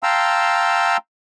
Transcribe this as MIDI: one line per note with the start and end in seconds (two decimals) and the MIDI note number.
0.03 0.97 77
0.03 0.97 79
0.03 0.97 81
0.03 0.97 82
0.03 0.97 84
0.03 0.97 88